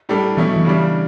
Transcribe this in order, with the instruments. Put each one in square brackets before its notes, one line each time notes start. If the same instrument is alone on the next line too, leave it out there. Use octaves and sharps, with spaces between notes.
[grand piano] A2 G3 D4 A4
[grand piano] B2 A3 C#4 E4 [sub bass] E3
[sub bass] F#3
E3
[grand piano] C#3 G3 D4